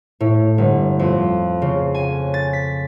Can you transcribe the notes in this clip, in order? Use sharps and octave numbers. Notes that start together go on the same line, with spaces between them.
A2
G1
F2
C#3
G#5
A6
B6